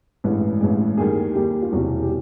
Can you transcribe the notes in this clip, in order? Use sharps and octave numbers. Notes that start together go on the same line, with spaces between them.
A1 G2 E3 G#3 B4
A1 G2 E3 G#3
D#2 D#3 G3 G#4
D#2 D#3 G3 G4
F4
E1 E2 C3 E3 G3 F#4
G4